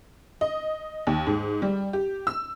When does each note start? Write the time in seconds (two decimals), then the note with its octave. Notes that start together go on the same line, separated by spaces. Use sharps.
0.41 D#5
1.07 D#2
1.27 G#2
1.62 G3
1.93 G4
2.27 E6